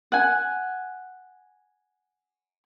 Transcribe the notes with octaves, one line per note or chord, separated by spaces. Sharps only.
F#5 G#5